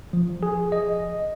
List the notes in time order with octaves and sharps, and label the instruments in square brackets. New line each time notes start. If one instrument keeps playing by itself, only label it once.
[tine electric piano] F3
G#4
D#5